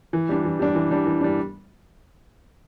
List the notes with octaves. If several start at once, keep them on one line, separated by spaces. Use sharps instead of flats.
E3
G3 D4
E3
G3 D4
E3
G3 D4
E3
G3 D4